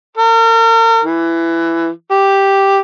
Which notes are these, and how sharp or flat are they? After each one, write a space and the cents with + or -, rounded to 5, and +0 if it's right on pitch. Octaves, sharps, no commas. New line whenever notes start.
A#4 -40
E3 +15
G4 +0